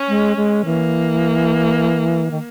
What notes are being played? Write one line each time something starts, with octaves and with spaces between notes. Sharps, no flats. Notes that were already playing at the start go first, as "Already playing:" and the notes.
Already playing: C#4
G#3
G#3
E3 A#3
D#3